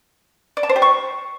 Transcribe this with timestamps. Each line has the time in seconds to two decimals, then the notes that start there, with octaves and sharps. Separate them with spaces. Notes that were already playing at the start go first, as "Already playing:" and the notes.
0.57 D5
0.63 A5
0.69 C5
0.76 G4
0.82 C#6